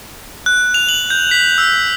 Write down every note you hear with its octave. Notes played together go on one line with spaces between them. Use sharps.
F#6
F7
F#7
G6
B6
E6